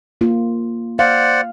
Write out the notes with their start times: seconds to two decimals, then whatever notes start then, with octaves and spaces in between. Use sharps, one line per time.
0.21 A#3 F4
0.99 C5 D5 F5 F#5